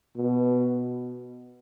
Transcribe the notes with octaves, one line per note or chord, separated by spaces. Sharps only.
B2